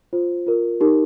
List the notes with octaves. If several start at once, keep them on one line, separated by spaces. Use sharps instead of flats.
F4 C5
F4 A#4
D#4 G4 A#4